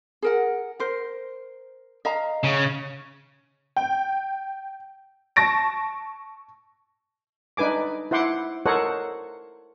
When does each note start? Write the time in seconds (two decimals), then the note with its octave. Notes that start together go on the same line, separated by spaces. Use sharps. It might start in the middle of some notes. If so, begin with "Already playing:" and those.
0.22 G#4 A#4 F#5
0.80 A#4 C5
2.05 D#5 F5 A#5
2.44 C#3
3.76 G5
5.36 A5 C#6 A#6 D7
7.57 D4 D#4 B4 G#5 D6
8.11 E4 C5 F#5 C6 D6
8.66 A4 A#4 C5 C#5 D#5 F#5